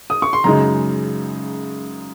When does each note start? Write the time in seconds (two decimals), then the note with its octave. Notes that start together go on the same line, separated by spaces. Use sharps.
0.10 D#6
0.22 C#6
0.33 C6
0.44 F#2 C#3 G#3 D#4 A#5